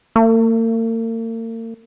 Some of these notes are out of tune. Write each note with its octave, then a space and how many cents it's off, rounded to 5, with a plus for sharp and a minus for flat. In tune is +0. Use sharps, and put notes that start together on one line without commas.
A#3 -45